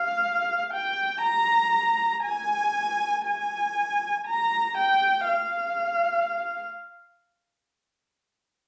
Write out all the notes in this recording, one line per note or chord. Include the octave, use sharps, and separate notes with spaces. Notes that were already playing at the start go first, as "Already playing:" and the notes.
Already playing: F5
G5
A#5
G#5
G#5
A#5
G5
F5